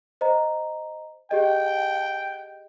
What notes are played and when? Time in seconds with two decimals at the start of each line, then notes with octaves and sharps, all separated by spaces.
0.21 C5 D#5 A#5
1.31 G4 G#4 D#5 G5